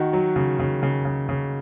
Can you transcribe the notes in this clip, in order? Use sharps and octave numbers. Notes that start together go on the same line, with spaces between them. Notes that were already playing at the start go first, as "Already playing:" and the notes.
Already playing: D#3 F#4
F#3
C#3
C#3
C#3
C#3
C#3